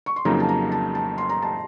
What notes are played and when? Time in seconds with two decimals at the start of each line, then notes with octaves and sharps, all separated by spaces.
0.06 C#6
0.16 C6
0.25 F2 C#3 F#3 A#3 D#4 A#5
0.40 A5
0.49 A#5
0.72 A5
0.95 A5
1.18 C6
1.29 A#5
1.42 A5